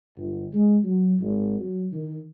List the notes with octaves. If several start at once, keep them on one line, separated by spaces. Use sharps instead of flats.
G1
G#3
F#3
G#1
F#3
D#3